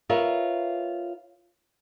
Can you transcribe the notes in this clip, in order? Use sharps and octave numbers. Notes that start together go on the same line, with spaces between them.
F4 A#4 B4 C#5 E5